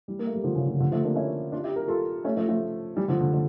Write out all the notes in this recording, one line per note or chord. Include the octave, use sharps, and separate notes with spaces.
E3 G3
A#3
A3
G3
D3 F3
C#3 E3
D3 F3
D3 F3
F3 A3
A#3 D4
C#4 E4
D4 F4
E4 G4
G4 A#4
F4 A4
A3 C#4
F3 A3
F3 A3
E3 G3
D3 F3
D3
D3